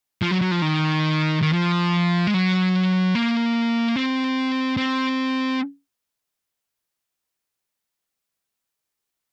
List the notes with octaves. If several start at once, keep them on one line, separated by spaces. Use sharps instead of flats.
F3
F#3
F#3
F3
D#3
D#3
F3
G#3
F#3
A#3
C4
C4